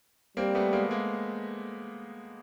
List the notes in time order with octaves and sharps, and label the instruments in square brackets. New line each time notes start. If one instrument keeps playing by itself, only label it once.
[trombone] G3 [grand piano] A#3 C4
[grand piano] A3 B3
G#3 A#3
G#3 A#3